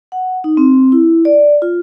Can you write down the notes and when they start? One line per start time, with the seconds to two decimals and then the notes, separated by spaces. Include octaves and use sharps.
0.12 F#5
0.44 D#4
0.57 C4
0.92 E4
1.25 D5
1.62 F4